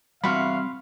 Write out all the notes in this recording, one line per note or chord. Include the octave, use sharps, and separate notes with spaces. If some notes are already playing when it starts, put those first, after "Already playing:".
E2 G3 C4 F#4 F5 B5 C6 F6